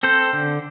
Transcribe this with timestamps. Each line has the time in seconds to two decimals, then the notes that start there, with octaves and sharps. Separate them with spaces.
0.03 C4 A4 C5
0.33 D3